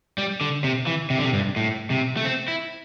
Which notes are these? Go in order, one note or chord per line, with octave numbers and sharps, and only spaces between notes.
G3
D3
C3
E3
C3
D3
C3
G2
A2
C3
A3
C4
E4